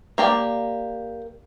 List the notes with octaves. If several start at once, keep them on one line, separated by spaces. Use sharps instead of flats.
A#3 G4 D5